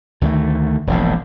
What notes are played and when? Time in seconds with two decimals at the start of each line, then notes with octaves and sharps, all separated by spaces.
0.21 D2 D#3 G3 A3
0.87 E1 A#1 G#2